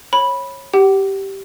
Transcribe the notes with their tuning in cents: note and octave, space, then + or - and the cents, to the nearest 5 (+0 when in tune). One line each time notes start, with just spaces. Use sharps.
C#5 -20 B5 -10
G4 -10 F#5 +40